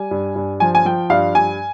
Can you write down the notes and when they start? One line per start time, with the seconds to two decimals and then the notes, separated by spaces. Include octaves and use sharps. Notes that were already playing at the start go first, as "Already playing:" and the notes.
Already playing: G3 G#5
0.11 G2
0.36 G2
0.60 F3 G#5
0.75 G#5
0.85 F3 G5
1.10 G2 F5
1.35 G2 G#5